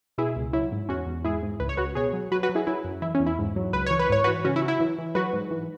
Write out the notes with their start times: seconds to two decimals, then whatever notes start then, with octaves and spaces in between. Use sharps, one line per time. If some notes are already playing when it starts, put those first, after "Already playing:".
0.18 B2 E4 G#4
0.36 C#2
0.53 F#3 E4
0.72 G#2
0.89 E2 C#4 F#4
1.07 E2
1.25 G#2 E4 G#4
1.43 G#2
1.60 C#2 B4
1.69 C#5
1.77 C#2 F#4 B4
1.95 B2 G#4 C#5
2.13 F#3
2.31 F#3 F#4 B4
2.43 F#4 B4
2.49 F#3
2.55 E4 G#4
2.67 F#3 E4
2.84 F#2
3.02 E3 E4
3.15 C#4
3.20 E2
3.27 E4
3.38 G#2
3.56 F#3
3.73 C#2 B4
3.86 E3 C#5
3.99 B4
4.10 G#2 C#5
4.24 F#4 B4
4.27 E3
4.45 C#3 C#4 F#4
4.56 E4
4.62 F#3
4.68 E4
4.80 E3
4.98 E3
5.15 F#3 F#4 B4
5.33 G#2
5.51 E3